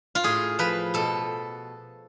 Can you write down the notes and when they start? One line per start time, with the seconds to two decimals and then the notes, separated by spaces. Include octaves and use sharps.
0.15 F4
0.24 A2 G#4
0.59 F3 B4
0.94 B2 A4